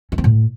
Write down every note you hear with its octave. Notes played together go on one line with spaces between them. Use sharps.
C#4
C4
A2